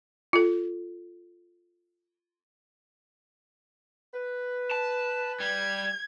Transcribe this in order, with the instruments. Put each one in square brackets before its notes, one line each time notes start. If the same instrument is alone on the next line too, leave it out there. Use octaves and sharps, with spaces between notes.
[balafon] F4 A4
[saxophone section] B4
[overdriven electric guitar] A5
[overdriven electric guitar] G3 [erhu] G#6